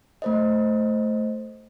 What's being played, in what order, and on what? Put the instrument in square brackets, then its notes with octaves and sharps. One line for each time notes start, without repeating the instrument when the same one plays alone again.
[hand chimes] A3 C5 D#5